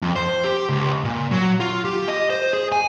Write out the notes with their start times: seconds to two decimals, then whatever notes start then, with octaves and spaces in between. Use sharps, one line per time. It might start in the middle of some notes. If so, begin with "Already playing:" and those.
0.02 F2
0.16 C5
0.44 G4
0.69 C#2
1.04 A#2
1.31 F#3
1.60 F4
1.85 G4
2.08 D#5
2.30 C5
2.53 G#4
2.72 G#5